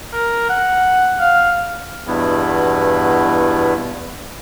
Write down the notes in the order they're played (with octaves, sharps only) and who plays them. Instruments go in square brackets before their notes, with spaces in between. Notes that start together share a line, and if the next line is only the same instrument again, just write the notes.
[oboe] A#4
F#5
F5
[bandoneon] E2 G2 B2 B3 E4